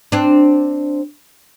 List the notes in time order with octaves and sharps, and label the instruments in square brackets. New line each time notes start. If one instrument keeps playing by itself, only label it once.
[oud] C4 D4